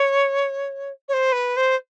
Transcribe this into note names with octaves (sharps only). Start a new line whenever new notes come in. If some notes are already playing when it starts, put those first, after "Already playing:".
Already playing: C#5
C#5
C5
B4
C5